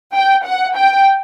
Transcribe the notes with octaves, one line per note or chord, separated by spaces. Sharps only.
G5
F#5
G5